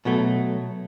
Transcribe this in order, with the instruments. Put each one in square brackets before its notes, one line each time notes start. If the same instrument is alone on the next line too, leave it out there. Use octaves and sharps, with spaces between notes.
[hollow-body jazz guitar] B2 F#3 A3